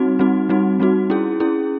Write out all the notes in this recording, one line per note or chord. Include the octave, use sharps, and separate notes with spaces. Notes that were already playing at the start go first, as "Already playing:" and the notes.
Already playing: G3 C4 D#4 F#4
G3 C4 D#4 F#4
G3 C4 D#4 F#4
G3 C4 D#4 F#4
C#4 E4 G#4
C#4 E4 G#4